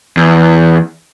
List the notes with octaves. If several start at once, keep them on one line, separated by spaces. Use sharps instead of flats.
E2